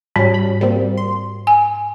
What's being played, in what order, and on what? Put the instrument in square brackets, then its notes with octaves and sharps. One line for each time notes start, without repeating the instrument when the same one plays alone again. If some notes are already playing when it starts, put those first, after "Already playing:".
[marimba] G#2 [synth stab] G3 C#4
[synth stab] B5
G3 A#3 C4
C6
[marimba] G#5